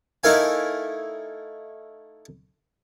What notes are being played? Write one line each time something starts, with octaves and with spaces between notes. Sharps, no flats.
A3 D#4 E4 A#4 F5 G#5